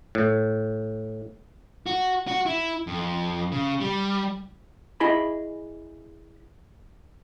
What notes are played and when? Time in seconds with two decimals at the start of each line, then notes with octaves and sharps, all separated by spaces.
0.15 A2
1.86 F#4
2.28 F#4
2.46 E4
2.87 F2
3.52 C#3
3.80 G3
5.00 E4 G#4 D#5 B5